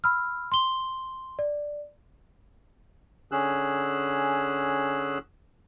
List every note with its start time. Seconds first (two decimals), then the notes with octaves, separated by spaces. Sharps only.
0.04 B5 E6 F6
0.52 C6 G7
1.39 D5
3.32 D3 C#4 G#4 E6 F#6